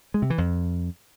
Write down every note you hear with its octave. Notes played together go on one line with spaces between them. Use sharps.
G#3
C3
E3
F2